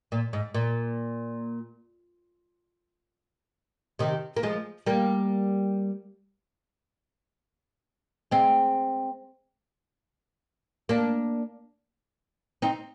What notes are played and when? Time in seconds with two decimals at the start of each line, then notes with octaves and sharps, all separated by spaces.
0.12 A#2
0.33 G#2
0.54 A#2
3.99 C3 D#3
4.37 A#3
4.43 F3 G#3
4.86 G3 A#3
8.31 G#3 C4
10.89 A#3 D4
12.62 C4 D#4